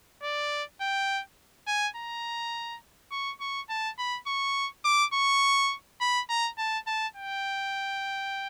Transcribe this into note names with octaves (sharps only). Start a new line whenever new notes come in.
D5
G5
G#5
A#5
C#6
C#6
A5
B5
C#6
D6
C#6
B5
A#5
A5
A5
G5